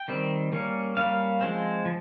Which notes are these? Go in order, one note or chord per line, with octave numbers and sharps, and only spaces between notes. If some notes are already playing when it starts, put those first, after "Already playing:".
Already playing: G5
D#3 G3 C4
G3 A#3 C#4
G3 A#3 C#4 F5
F3 G#3 C4
F3